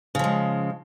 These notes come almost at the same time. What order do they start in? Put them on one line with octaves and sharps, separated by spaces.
C#3 F3 G#3